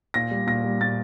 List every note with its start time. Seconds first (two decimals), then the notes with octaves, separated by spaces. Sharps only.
0.14 A#2 A#6
0.31 G3
0.47 A#2 A#6
0.64 G3
0.81 A#2 A6